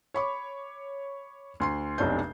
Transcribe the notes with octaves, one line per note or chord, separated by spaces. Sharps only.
C#5 B5 C#6 D6
D2 C6 C7
F1 B1 C3 D4 C#5 G6